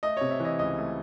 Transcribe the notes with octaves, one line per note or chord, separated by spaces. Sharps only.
A3 D#5
C3 C#5
E5
E3 D#5
C#2 D#5
A3